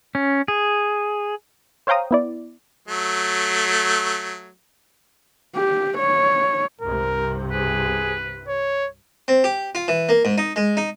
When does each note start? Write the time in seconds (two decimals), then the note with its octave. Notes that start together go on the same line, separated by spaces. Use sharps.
0.15 C#4
0.48 G#4
1.87 C5 C#5 F5 G5 A#5 D#6
2.11 B3 E4 D5
2.88 F#3 A3
5.56 G4
5.98 C#5
6.81 C2 G2 C3 A#4
7.52 G#4 B4
8.48 C#5
9.28 C4
9.44 G4
9.75 F4
9.88 E3
10.09 A#3
10.25 G#2
10.38 D#4
10.56 G#3
10.77 D#4